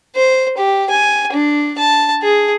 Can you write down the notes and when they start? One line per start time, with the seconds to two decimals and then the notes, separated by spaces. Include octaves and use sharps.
0.16 C5
0.57 G4
0.90 G#5
1.32 D4
1.78 A5
2.23 G#4